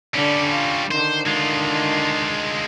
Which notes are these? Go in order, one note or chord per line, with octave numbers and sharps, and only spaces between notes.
D3 G3 C#4 D5
F4
D3 D#3 C5
G#3 F4